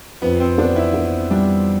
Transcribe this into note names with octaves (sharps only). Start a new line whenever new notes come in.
F2 B3
C4
B3 D4
E4
B3
G3 D4